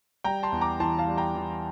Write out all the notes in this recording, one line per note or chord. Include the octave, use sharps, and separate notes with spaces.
G3 G5 A#5
A5 C6
E2
A#5 D6
E3 A5 C6
F5 A5
G3
G5 A#5
E3